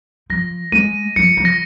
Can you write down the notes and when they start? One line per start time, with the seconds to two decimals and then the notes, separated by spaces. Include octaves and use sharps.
0.30 F3 A#6
0.72 G#3 D#7
1.16 F3 C#7
1.37 F3
1.45 A#6